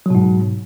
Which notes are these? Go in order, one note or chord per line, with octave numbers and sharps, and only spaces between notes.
G#2 B2 F#3